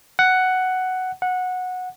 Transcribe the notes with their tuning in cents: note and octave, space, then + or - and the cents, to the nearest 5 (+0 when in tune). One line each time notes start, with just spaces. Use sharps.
F#5 +5
F#5 -15